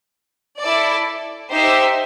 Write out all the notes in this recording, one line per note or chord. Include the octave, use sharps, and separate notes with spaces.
E4 A4 D5
D#4 G4 C5 E5